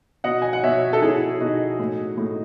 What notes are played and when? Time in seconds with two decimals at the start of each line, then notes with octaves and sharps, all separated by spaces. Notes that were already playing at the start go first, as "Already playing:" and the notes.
0.24 B2 D#5 F#5
0.42 G#5
0.53 F#5
0.63 B2 C#5 E5
0.93 A4
1.02 B2 E4 G#4
1.40 B2 D#4 F#4
1.79 A2
2.17 A2